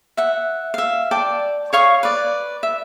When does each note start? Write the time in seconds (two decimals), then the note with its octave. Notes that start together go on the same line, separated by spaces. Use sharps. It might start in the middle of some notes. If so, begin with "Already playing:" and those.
0.17 E5 F#5
0.74 E5 F5
1.11 D5 G5 A5
1.73 C#5 F5 C#6 D#6
2.03 B4 D5
2.63 E5